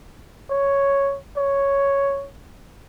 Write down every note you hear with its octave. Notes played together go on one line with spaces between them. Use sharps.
C#5
C#5